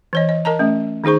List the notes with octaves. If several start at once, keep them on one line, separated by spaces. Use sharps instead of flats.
E3 C#5 D#5
D#5
A#4 D#5 A5 A#5
A3 C#4
D#3 D#4 G#4 C5 C#6